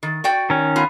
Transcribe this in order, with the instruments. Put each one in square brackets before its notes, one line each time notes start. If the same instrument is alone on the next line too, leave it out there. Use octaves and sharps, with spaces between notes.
[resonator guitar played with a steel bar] D#3
F#4 D5 G5
[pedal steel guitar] D#3 C#4
[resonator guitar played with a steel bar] B3 F4